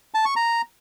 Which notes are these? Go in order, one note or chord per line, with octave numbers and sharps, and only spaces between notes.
A5
C#6
A#5